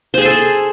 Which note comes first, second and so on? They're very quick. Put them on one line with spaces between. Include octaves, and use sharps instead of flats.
C5 G#4 G#5 A4